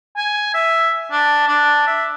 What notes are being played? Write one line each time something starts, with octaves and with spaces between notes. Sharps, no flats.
G#5
E5
D4
D4
E5